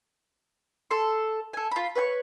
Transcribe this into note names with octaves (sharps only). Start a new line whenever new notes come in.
A4 C6
A4 G#5
F4 B5
B4 C#5 G#5 C#6